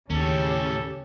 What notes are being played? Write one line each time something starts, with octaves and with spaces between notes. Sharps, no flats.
D#2 A2 C#3 C#4 G4 A4